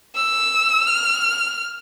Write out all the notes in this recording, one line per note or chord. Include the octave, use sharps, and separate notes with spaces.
E6
F6